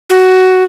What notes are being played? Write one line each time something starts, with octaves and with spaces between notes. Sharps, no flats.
F#4